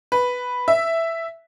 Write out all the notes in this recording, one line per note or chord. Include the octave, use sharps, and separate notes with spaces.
B4
E5